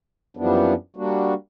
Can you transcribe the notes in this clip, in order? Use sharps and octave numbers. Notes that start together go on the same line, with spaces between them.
F#2 E3 F3 G3 B3 D4
G3 A#3 D4 F#4